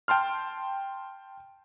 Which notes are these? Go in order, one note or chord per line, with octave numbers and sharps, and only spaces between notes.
G5 A5 C6 F6